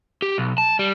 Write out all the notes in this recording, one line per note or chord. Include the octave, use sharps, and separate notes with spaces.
G4
B1
A5
G3